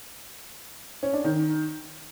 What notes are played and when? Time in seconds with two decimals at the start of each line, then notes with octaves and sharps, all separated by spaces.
1.03 C#4
1.13 D4
1.24 D#3